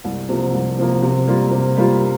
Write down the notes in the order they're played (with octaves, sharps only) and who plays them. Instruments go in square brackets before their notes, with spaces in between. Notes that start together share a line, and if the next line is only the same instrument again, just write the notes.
[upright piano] C2
C3 F3 A#3
C2
C3 F3 A#3
C3
G3 A#3 F4
C3
G3 A#3 F4